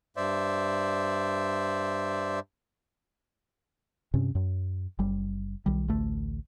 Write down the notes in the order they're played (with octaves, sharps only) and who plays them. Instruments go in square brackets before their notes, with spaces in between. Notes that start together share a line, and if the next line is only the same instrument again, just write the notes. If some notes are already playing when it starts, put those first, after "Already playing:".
[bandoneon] G2 C5 D5 E5
[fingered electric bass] G2 C3 C#4
F#2
F#1 G3
B1 D#3 G3
A1 D2 A3